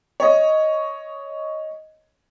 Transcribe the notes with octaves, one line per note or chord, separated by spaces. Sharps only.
C#5 D#5